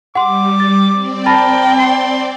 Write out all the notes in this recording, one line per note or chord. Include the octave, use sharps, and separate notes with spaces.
G3 F#5 C6 D6
A6
C4 D5
A#4 G5 A5 B5 A6
C6